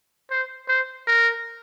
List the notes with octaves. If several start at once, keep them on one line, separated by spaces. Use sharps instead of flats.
C5
C5
A#4